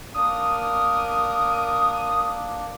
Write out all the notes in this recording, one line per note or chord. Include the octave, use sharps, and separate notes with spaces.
A#3 D4 A#4 D#6